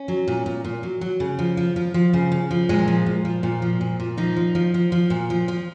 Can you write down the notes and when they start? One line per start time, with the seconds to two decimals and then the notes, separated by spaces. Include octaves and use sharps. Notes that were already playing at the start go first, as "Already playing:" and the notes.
Already playing: C#4
0.08 F#3
0.27 A#2
0.46 A#2
0.64 A#2
0.83 F#3
1.01 F#3
1.20 C#3
1.39 F3
1.57 F3
1.76 F3
1.94 F3
2.13 C#3
2.32 C#3
2.51 F3
2.69 A#2 G#3
2.88 F3
3.06 A#2
3.25 F3
3.43 A#2
3.62 F3
3.81 A#2
4.00 A#2
4.17 F3 D#4
4.36 F3
4.55 F3
4.74 F3
4.92 F3
5.10 A#2
5.30 F3
5.48 F3